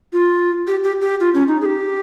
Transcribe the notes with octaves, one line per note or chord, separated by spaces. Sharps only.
F4
G4
G4
G4
F4
C#4
D#4
G#4
G4